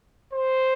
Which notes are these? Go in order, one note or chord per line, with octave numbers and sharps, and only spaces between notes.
C5